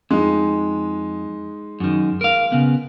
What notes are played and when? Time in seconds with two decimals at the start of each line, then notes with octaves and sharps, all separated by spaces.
0.11 F2 G#3 D#4
1.80 F#2 D#3
2.21 A#4 F5
2.52 C#3 B3